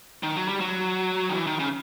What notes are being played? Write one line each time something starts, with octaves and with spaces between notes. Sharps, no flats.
D#3
F#3
G3
F#3
D#3
E3
D#3
C#3